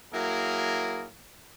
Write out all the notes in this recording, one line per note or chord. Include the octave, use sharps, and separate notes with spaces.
F#3 A#3 E4 G#4 A#4